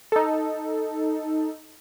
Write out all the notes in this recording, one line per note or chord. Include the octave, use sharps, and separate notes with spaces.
D#4 A4